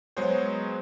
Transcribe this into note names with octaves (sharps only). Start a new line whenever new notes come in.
F#3 G#3 B3 G#4 C5 C#5